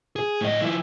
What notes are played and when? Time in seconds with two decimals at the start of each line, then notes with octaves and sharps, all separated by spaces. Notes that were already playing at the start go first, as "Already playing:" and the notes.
0.16 G#4
0.41 A2 D#5
0.61 F3 E4